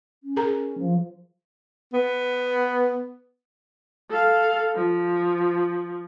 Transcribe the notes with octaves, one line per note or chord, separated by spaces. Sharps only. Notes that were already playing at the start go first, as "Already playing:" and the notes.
C#4
G#4 A#4 A#5
F3
B3
A4 F5
F3